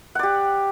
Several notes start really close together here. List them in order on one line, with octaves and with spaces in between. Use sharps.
F#5 D5 G4